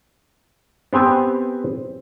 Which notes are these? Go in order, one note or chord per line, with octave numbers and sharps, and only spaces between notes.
B3 C4 G4 G#5